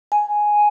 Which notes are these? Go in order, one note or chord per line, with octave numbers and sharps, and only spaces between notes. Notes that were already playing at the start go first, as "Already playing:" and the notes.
G#5